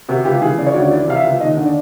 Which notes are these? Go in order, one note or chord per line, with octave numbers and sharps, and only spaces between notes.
C3 F#4
C#2 G4
E3 G#4
C#3 D5
C#5
D2 D5
E3 D5
C3 F5
E5
C#2
D#2 D#5
D3
D5